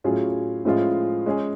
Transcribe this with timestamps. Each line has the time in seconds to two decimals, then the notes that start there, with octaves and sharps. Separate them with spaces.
0.04 A2 F#3 C#4 F4 G#4
0.65 A2 F3 G#3 C#4 F4
1.26 G#3 C#4 G#4